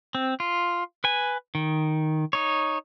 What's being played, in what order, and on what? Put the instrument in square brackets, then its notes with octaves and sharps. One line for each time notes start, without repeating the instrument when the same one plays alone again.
[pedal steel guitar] C4
F4
B4 G#5
D#3
D#4 C#5